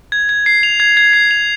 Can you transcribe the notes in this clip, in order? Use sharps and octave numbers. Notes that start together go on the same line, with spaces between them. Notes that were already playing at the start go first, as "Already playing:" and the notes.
G#6
G#6
C7
F7
G#6
G#6
C7
F7